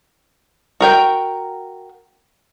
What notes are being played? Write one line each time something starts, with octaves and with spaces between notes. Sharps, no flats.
F#4 A#4 G5